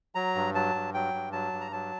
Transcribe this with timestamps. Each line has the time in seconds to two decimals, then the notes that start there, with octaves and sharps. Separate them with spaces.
0.15 F#3 A#5
0.35 G2
0.55 F#3 A5
0.75 G2
0.94 F#3 G5
1.14 G2
1.32 F#3 A5
1.52 G2
1.61 A#5
1.72 F#3 A5